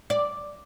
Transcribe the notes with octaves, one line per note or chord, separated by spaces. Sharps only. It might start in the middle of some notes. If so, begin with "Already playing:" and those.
D5